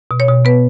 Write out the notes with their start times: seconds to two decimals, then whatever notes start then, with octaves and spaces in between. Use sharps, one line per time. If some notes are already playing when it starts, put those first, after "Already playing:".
0.11 B2
0.20 C#5
0.28 B2
0.45 B3 B4